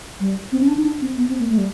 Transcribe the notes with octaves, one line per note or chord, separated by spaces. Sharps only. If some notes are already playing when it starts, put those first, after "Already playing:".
G3
C4
C#4
D4
D#4
D4
C4
B3
C4
A#3
A3
G3